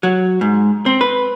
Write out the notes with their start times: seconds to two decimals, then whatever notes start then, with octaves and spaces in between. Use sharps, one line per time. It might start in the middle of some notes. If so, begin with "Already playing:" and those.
0.03 F#3
0.41 G#2
0.86 C4
1.01 B4